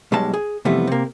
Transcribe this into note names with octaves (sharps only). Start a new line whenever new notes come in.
B1 B2 G3 G#3 A5
G#4
F2 C3 E3 G3 A3 B3
C3 A#3